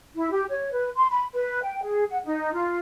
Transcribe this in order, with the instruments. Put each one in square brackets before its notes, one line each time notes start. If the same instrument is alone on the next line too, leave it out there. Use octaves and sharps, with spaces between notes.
[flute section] E4
G4
C#5
B4
C6
B5
B4
G5
G#4
F#5
D#4
F4